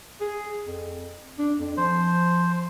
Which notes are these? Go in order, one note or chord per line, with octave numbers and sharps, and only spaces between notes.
G#4
F2
D4
F2
F3 C5